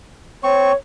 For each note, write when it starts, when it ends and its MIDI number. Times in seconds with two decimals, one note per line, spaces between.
0.44 0.72 60
0.44 0.74 73
0.44 0.72 85